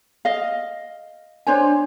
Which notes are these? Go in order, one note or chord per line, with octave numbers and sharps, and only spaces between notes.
D#5 F5
D4 C5 C#5 G#5